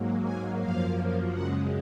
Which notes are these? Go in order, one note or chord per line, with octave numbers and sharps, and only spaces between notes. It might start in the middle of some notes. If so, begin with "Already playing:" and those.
Already playing: G#2 F#3 A#3
G#5
F#2 F3 A#3 F5
F#2 C#3 G#3 F#5